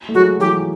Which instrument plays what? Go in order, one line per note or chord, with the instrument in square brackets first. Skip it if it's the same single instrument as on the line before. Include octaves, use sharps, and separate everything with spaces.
[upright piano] A3
[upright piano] F#3 G#3 [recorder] F#4
[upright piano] E3 F#3 [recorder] G4